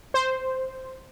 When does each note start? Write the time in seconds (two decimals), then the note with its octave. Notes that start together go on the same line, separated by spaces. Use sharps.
0.14 C5